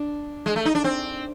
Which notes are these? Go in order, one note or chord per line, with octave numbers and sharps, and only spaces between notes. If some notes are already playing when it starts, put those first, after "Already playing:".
Already playing: D4
G#3
A3
D#4
D4
C4